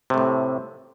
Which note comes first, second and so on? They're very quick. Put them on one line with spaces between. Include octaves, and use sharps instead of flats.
C3 A3 A2